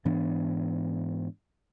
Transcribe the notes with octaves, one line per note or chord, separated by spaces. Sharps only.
G#2 E3 B3 D4